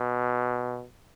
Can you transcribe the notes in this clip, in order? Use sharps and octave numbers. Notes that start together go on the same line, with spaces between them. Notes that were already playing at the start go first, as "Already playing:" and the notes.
Already playing: B2